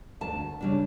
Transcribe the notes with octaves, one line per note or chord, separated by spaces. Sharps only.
D2 A5
C#3 G3 D4